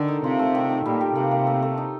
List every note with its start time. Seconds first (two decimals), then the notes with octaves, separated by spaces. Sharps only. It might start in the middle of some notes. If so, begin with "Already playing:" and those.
Already playing: D3 D#3 A4
0.08 D#4
0.23 C3 F4
0.39 A3
0.55 D#3
0.69 D#3
0.86 A#2 G3
1.01 G3
1.16 C3 A#3
1.31 A#3
1.47 A3
1.63 A3
1.78 D#4